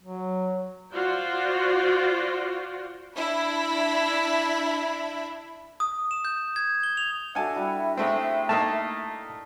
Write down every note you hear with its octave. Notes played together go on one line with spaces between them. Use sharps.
F#3
F4 F#4 C5 D5
D4 E4 B5
D#6
E7
G6
G#6
G7
F7
D4 F#4 A4 E5 F#5 G#5 A5
G3 E4 F#4
G#3 A3 C4 D4 G4
A3 A#3 D#4 A5